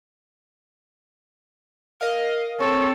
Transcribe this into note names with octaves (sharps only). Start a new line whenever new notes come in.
A#4 D#5 F5
C4 A4 C#5